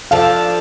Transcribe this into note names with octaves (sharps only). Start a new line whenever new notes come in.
F3 D4 A4 F5